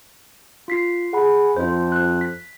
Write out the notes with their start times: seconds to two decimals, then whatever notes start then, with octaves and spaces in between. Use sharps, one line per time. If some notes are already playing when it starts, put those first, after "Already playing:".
0.68 F4 B6 C7
1.13 G#4 F#5 B5
1.56 F2 F4 C5
1.92 F#6
2.21 B6